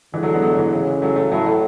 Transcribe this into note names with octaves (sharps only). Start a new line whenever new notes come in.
D3 E3 G#3
F#3 A3
G#3 B3
F#3 A3
E3 G#3
C#3
F#3 A3
F#3 A3
A2 F#3 A3
F#3 A3